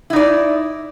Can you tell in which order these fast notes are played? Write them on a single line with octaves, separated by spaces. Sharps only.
E4 D#4 D5